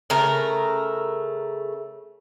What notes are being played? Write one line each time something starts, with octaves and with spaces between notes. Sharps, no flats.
C#3 A3 A#4